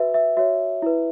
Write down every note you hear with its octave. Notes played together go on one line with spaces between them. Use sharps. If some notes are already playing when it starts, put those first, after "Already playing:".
Already playing: F#4 B4 E5
E5
F#4 C#5 E5
E4 B4